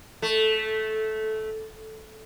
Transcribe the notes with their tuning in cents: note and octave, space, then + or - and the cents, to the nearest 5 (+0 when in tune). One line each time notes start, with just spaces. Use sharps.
A3 -10